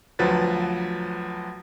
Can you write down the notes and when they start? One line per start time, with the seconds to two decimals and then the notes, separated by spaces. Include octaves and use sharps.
0.19 D2 F3 F#3 B4 A6